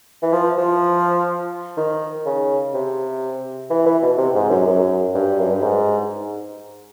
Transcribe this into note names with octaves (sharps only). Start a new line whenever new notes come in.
E3
F3
F3
D#3
C#3
C3
E3
E3
B2
C3
G#2
F#2
F#2
G2
F#2
G2
G#2